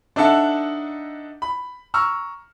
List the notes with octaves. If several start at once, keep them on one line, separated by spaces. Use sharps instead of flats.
D4 D#4 A4 E5 F#5 A5
B5
A#5 C#6 E6 F6